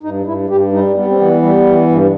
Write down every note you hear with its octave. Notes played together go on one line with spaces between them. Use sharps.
G2 D#4
G2 E4
G2 G4
G3 D#4
G3 B3
C4
E3 B3
G3
E3
G2